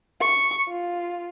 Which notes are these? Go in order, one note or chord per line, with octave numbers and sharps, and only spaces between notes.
C#6
F4